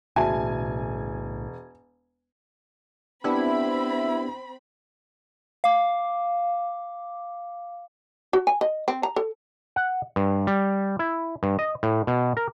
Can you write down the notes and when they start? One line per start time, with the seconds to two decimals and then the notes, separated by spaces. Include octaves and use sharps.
0.16 E1 B1 A2 C#3 F#4 E5 G#5 A5
3.24 B3 C4 D4 E4 G4 B5
5.64 F5 D6
8.33 F#4
8.47 G#5
8.61 D#5
8.88 C4
9.03 A#5
9.16 A4
9.76 F#5
10.16 G2
10.47 G3
10.99 E4
11.43 G2
11.59 D#5
11.83 A2
12.07 B2
12.37 A#4